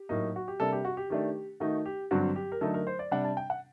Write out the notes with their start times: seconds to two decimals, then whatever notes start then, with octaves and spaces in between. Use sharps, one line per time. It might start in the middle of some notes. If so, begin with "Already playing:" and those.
Already playing: G4
0.09 A2 F#3 A#3 D#4
0.36 F#4
0.48 G4
0.60 C3 G3 A#3 D4 A4
0.73 G4
0.85 F#4
0.97 G4
1.10 D#3 A3 D4 G4
1.60 D#3 A3 D#4 F#4
1.86 G4
2.11 G2 D3 F#3 C4 F#4
2.36 G4
2.52 A#4
2.61 D3 F#3 A3 D#4 A4
2.74 A#4
2.87 C5
2.99 D5
3.11 C3 G3 D4 F#5
3.24 A5
3.37 G5
3.50 F#5